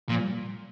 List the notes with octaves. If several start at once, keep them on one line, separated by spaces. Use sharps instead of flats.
A#2 F3
G3